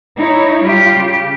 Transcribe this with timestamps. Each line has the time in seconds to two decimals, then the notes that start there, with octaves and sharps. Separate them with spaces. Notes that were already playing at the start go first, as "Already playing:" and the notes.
0.17 D#4 E4 C#5
0.64 G3 F4 G4
0.97 C#3